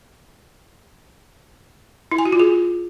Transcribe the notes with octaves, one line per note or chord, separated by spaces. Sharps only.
E4
G#5
F#4
F4
G#4